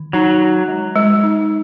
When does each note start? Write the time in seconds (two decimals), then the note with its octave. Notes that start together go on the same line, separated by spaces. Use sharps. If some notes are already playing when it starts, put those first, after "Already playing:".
Already playing: D#3
0.13 F#3 D#4
0.41 F#4
0.68 G#3
0.96 G#3
1.23 D#4